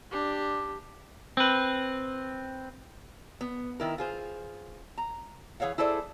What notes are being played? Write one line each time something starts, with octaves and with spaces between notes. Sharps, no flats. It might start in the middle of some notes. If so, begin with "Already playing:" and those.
D4 G4
C4 B4
B3
D#3 E4 A#4
F4 G#4 C5
A#5
E3 G#4 C#5 F5 F#5
E4 G#4 A4 C5 D5